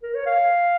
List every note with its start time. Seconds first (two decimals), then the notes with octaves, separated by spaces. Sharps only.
0.03 A#4
0.14 C#5
0.26 F5